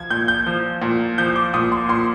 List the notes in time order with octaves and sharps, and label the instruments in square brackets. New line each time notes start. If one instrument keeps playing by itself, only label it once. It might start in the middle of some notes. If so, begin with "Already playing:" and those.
Already playing: [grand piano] F3 G#6
A#2 G6
G6
F3
A#2
F3 G6
D6
A#2 D#6
C6
A#2 C6